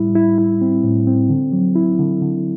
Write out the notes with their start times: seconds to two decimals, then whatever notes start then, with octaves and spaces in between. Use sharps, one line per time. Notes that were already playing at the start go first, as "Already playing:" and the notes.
Already playing: A2 G3 E4
0.15 E4
0.38 E4
0.61 C4
0.84 A2
1.07 C4
1.29 D3
1.52 F#3
1.75 E4
1.99 D3
2.21 D3